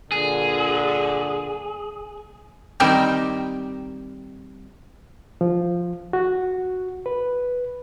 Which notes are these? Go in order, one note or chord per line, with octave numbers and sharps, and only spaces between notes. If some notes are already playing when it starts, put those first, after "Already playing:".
G2 A#2 D3 G#4
D#3 G3 C4 D#4 G4 A#4
F3
F#4
B4